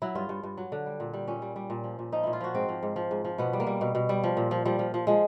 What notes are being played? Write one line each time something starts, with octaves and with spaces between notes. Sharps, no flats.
F#3 E4
G2 F4
G2
G2
F#3
D3
G3
A#2
G3
A#2 C#4
G3
G3
A#2
F3
A#2
F3 D#4
A#2 E4
F4
F3 F#4
G#2 C4
F3
G#2
F3
G#2
F3
B2 B3
G3
A#3
G3
B2
B2
G3
F3
A#2
F3
F3 G3
F3
F3
F3 G#3